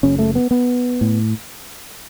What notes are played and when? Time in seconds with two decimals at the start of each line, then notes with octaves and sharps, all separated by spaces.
0.03 F#1 F#2 C#3 C#4
0.19 A3
0.35 B3
0.51 B3
1.01 A2